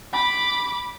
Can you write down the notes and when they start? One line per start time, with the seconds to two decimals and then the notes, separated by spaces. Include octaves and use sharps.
0.13 B5 D6